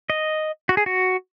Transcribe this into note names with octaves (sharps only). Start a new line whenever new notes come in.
D#5
F#4
G#4
F#4